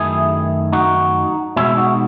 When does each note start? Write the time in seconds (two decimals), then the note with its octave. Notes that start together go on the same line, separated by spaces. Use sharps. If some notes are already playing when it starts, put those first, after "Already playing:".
Already playing: F#2 D#3 A3 E4 G#4
0.72 D#4 F#4
1.56 B2 G#3 C#4 E4
1.77 D#4 F#4